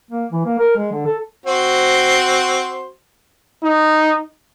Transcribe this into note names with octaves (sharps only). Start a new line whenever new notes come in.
A#3
E3
A#3
A#4
G#3
D3
A4
C4 F#4 C5
D#4